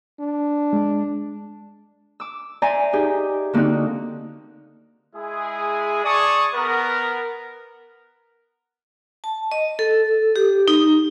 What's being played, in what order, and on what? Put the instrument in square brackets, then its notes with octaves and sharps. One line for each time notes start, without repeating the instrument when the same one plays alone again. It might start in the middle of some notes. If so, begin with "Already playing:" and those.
[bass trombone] D4
[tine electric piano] G#3
[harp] D6 E6
C5 D5 E5 G#5 A#5
D#4 G4 G#4
D3 A#3 C4 D#4 F#4
[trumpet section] G#3 E4 G#4
G#4 D5 A5 C#6 D#6
B3 A#4
[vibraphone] A5
D#5
A4
G4
D#4